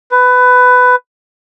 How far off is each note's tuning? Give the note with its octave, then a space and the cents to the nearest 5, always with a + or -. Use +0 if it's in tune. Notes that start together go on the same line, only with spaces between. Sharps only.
B4 +15